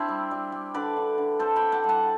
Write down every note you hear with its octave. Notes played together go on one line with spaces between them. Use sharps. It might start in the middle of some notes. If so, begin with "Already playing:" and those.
Already playing: C4 D4 E4
G3
G3
G3
D3 B4 D5
D3
D3
C4 A4 C5
G5 B5
C4
F#5 A5
G3
F#5 A5